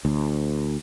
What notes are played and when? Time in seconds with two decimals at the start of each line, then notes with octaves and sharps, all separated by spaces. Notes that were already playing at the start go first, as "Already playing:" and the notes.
0.05 D2